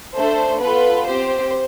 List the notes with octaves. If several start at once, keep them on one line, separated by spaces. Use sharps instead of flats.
A3 D4 A4 C5
B3 F4 A4 B4
C4 G4 C5